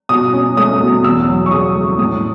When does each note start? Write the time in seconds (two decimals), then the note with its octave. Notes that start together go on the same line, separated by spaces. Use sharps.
0.09 B2 D#6
0.33 C#4
0.57 A3 D#6
0.80 B2
1.04 E2 E6
1.28 F#3
1.46 C#6
1.51 C#3 D#6
1.75 A3
1.99 A2 D#6